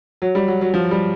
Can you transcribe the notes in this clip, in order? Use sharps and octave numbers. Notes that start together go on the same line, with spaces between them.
F#3
G3
F#3
F#3
F3
G3